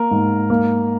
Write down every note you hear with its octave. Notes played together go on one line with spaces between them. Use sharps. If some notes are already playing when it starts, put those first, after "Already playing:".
Already playing: A#3 A#4
G#2
A#3